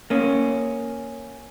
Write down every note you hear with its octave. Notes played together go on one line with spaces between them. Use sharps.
A#3 C#4